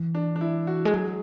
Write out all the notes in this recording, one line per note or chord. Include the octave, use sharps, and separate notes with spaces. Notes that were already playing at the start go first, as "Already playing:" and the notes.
Already playing: E3
D4
D4
E4
F#4
G#3
F#3 G#4